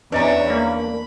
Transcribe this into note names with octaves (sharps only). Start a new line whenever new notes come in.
E2 C#4 D4 B4 C#5 D#5 E5 A#5
A#3 B5